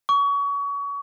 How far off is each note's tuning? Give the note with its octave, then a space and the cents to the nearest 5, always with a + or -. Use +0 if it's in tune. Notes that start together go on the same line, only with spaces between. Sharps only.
C#6 +30